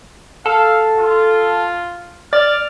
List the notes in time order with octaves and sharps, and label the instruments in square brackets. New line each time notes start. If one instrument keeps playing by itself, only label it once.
[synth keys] A4 [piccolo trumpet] F5
[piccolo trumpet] F4
[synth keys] D5 A6 [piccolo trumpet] F6